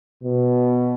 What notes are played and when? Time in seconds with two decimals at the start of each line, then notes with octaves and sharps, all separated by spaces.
0.23 B2